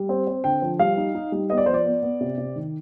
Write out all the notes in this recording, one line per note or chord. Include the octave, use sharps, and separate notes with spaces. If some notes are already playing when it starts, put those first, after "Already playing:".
Already playing: G3
C4
C4
D3 G5
F3
G3 F5
D#4
D#4
G3
B3 D#5
D5
F3 C5
D5
B3
B3
C3
C3
D#3